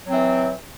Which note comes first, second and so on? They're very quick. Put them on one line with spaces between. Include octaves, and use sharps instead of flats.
F#3 C4 E3